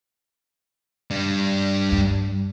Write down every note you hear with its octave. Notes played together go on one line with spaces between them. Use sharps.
G3 D4
G2